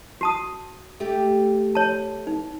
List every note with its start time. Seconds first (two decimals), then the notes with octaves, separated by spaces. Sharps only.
0.21 F#4 A5 D#6
1.00 A3 G4
1.75 C#5 A5
2.27 D#4